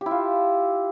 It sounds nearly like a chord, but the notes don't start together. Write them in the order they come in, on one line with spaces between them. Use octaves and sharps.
G4 E4 F4